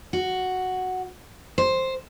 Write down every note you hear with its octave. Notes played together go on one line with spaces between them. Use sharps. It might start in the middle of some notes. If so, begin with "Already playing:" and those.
F#4
C5